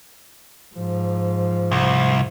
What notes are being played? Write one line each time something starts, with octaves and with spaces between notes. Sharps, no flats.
G#2 F3
C2